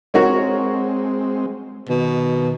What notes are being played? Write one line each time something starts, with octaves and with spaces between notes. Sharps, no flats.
G#3 C4 F#4 A#4 C#5
B2 D#3